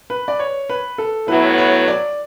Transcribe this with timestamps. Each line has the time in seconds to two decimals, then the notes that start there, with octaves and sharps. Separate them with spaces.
0.10 B4
0.28 D5
0.39 C#5
0.69 B4
0.98 A4
1.28 A2 F#3 B3 E4 B4
1.58 C#5
1.88 D5